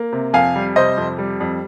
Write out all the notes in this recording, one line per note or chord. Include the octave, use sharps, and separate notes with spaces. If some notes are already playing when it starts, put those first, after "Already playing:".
Already playing: A#3
C3
F2 F5 G#5
G3
C3 C5 D#5
F2
G3
F2